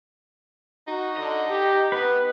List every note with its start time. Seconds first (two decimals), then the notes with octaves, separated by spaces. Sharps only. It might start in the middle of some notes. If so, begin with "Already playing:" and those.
0.88 D#4 F#4
1.17 D3 D#5
1.49 G4
1.92 B3 B4